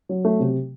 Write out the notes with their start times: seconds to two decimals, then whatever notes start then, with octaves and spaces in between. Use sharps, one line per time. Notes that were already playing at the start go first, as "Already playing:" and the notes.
0.09 F#3
0.25 A3
0.40 C3